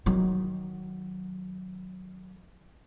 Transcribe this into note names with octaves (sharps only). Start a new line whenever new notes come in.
D#3 F#3